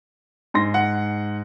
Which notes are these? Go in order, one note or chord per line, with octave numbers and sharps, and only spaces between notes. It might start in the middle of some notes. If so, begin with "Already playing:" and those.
G#2 C6 A#6
F#5